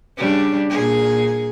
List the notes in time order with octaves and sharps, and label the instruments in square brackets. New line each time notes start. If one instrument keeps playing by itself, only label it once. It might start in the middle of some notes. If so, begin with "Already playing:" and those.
[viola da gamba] C#3 G3 D4
A#2 G#4